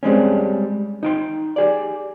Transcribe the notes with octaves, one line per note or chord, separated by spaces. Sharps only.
G3 G#3 C4 C#4
D#4 G5 C6
G4 G#4 D5